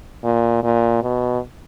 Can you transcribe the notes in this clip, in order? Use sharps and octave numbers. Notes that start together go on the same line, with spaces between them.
A#2
A#2
B2